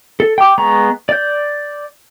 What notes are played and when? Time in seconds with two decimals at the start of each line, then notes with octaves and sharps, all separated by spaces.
0.20 A4
0.38 G5 D6
0.58 G#3 B3 A#5 C#6
1.09 D5 G6